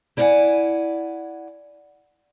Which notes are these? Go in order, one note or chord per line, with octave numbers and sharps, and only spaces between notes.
E4 D5 D#5 F5 F#5 G#5